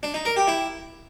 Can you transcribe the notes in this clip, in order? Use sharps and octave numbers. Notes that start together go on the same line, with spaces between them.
D4
D#4
A#4
G4
E4